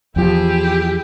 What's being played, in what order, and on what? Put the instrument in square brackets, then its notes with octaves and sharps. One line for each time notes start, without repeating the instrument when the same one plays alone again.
[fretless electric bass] E2 F3 [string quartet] E4 G4 G#4